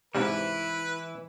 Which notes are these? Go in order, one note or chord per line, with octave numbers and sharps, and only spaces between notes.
G#2 C3 E3 G3 E4 B4